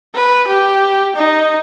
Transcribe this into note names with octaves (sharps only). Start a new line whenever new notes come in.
B4
G4
D#4